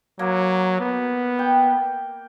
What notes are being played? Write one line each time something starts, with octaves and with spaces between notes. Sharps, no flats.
F#3 A#3
B3
G5